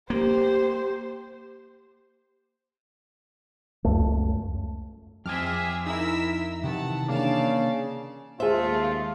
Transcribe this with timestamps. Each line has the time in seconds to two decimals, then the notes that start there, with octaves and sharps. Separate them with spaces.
0.10 A#3 G4 C5
3.84 C#2 F#2 A3
5.26 F2 C4 G#4 E5 G#5 D6 F6
5.87 D#4 E4 A#4 E6 B6
6.64 C3 D#3 E3 F#5 A5
7.08 C#3 A#3 D4 D5 F5 A5
8.40 D#2 G#3 A3 F4 G#4 C5 E5